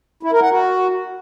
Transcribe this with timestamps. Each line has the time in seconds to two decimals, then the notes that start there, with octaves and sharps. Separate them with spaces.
0.23 E4
0.32 A#4
0.42 F#5
0.51 F#4